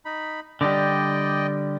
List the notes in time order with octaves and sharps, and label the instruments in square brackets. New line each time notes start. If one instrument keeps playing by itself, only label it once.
[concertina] D#4 B5
[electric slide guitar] D3 G3 [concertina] D5 D#5 G5